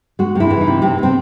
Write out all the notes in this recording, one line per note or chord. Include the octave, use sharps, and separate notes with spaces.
G#3 F#4
C3 E4
E3
D#4
C3
C3 C4
C3 C4